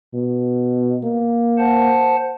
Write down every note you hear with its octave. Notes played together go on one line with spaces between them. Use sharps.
B2
A#3
C5 F#5 A5